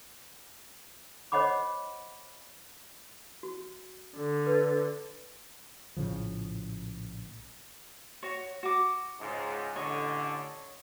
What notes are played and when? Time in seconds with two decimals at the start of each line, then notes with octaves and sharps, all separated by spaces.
1.32 C5 C#5 D#5 F#5 B5 D6
3.43 F#4
4.18 D3
4.46 B4
5.97 A#1 A2 C#3 F3
8.23 F#4 C#5
8.63 F#4 D6
9.20 C#2 G#2
9.76 A1 D3 C#5 D#5